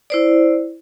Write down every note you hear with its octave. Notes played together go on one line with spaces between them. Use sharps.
E4 C5 D5